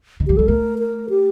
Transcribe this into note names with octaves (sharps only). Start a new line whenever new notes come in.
D#3
F3 G4
G3 A4
A3 A#4
A#4
G4